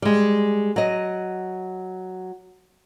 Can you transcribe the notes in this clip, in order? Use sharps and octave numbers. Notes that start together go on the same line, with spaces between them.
G3 G#3
F#3 D#5